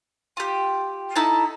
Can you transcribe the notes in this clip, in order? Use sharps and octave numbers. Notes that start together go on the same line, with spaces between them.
F4 G4
D#4 E4 A4 A5